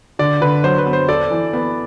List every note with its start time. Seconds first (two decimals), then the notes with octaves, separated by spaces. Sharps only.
0.19 D3 D5
0.41 D3 B4
0.64 F#3 C5
0.78 B4
0.86 B3
0.93 C5
1.08 A4 D5
1.31 E3
1.53 B3